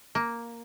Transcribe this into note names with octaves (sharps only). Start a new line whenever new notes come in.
A#3